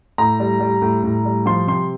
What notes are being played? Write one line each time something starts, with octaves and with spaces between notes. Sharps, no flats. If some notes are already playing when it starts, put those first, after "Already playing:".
A2 A#5
G3
G3
A2
A2
G3
F3 C6
C3 C6